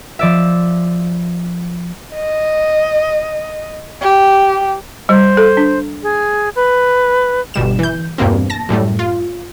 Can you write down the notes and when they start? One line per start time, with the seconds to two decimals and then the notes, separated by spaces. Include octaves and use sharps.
0.19 F3 D5 E5
2.15 D#5
4.02 G4
5.09 G3 C5
5.37 A4
5.57 D4
6.03 G#4
6.56 B4
7.54 G1 B2 G3 E7
7.79 E3 G6
8.18 E2 G2 B2 A#3 C4
8.50 A5 A#6
8.69 F#2 A2 G3 A3
8.99 F4